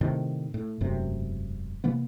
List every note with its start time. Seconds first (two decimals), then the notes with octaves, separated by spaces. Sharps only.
0.01 A2 C3 D#3
0.54 A2
0.81 E1 F#2 A2 C3
1.84 C3 E3 A#3 B3